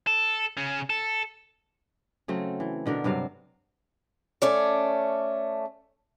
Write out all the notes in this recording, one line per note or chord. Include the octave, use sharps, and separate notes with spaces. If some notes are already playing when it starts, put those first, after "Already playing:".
A4
C#3 C#4
A4
C#3 F#3 A3 C4
E3
B2 D3 D4 A#4
G2 C3 F#3 F5
A3 C#4 D5